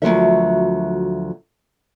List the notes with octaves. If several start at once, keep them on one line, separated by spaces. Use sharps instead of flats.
D2 D#3 F3 F#3 A#4 E5